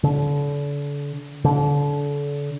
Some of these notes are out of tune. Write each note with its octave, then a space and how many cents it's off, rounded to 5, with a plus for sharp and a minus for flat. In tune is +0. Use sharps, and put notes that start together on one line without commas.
D3 -35
D3 -35